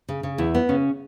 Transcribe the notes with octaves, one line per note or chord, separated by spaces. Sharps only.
C#3
C#3
E2 E4
B3
C#3 C#4